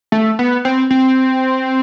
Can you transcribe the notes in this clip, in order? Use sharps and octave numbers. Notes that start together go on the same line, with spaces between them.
A3
B3
C4
C4